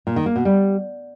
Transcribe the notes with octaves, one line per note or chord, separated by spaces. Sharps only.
A#2
D#3
A#3
B2
G3